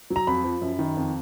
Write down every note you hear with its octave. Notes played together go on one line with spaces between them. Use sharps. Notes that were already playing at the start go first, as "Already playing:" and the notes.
F#3
A#5
F2 B5
F3
F#2
D#3
F2